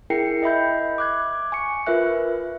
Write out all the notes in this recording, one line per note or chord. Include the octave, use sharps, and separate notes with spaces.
E4 G#4 A#4 G5 C7 C#7
D#5 E5 B5 G6
D6 F#6 G#6
G#5 C#6 C#7
F4 A#4 B4 E5 F#6